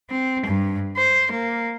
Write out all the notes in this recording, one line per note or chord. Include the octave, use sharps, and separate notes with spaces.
C4
G2
C5
A#3